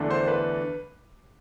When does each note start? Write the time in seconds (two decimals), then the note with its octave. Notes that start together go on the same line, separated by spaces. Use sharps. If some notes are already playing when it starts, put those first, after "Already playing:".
Already playing: E2 D3 A3 D4
0.10 C5
0.28 B4